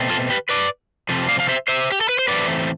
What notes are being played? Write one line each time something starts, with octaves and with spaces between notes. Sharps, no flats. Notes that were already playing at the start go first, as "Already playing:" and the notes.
Already playing: B2 A3 C4
F4 A4
G4 B4
B4 D5
C3 F3 A3
D5 F5
F5
C5 E5
C5 E5
G4
A4
B4
C5
A2 E3 A3 C4 B4 D5